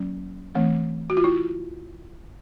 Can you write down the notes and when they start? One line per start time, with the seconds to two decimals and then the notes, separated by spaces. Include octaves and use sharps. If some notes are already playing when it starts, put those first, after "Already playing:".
Already playing: F#3 A#3 C#4
0.55 E3 A3 C4
1.10 F#4
1.17 F4
1.24 E4